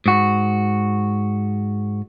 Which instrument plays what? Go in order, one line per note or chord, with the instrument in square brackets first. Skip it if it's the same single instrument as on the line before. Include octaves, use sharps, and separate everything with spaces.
[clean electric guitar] G#2 F#4